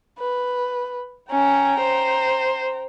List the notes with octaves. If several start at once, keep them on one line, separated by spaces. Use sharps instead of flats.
B4
C#4 G5 A#5
C5